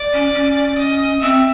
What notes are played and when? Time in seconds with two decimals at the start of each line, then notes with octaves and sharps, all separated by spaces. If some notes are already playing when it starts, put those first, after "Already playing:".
Already playing: D5
0.13 C#4
0.34 C#4
0.78 D#5
1.22 C4 E5